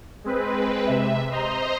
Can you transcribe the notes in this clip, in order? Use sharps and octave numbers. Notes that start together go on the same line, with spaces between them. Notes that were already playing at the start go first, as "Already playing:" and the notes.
G#3 C4 B4
C3 E5
C5 D#5 A#5 C6